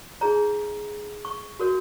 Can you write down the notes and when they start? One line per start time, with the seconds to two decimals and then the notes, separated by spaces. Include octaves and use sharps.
0.21 D#4 G#4 C#5 A#5
1.25 C#6
1.60 F#4 A#4 C#5